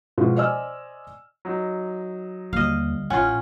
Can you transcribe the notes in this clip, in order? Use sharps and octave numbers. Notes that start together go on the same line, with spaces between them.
B2 F3 G#3
C5 D5 D#5 G#5 E6 F6
F#3 D#4
D#2 D3 G3 D#5 F5
A1 C#4 F4 F#5